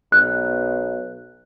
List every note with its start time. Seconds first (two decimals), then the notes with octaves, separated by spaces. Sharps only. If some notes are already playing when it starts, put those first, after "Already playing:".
0.12 B1 F#6